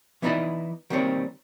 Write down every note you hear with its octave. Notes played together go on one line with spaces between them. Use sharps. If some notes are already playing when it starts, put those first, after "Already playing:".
E3 B3 D#4 E4 D5 D#5
D#3 G3 A#3 C4 C#5